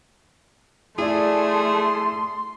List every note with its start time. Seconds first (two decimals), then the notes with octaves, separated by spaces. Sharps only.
0.98 A3 E4 G#4 D5 C6